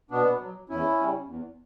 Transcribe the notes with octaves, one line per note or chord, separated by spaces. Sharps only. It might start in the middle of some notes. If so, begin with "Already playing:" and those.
B2 B3 D4
F#3
E2 C#4 E4
C#3 G3
E2